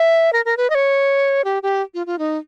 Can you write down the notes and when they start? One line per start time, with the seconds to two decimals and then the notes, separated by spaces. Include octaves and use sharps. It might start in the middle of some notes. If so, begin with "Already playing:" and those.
Already playing: E5
0.33 A#4
0.45 A#4
0.57 B4
0.70 D#5
0.75 C#5
1.44 G4
1.63 G4
1.94 F4
2.06 F4
2.19 D#4